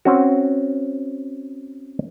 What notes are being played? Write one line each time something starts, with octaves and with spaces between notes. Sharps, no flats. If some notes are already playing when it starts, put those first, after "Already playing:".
C4 C#4 F#4